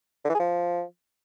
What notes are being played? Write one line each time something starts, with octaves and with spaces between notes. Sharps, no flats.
D3
E3
G#4
F3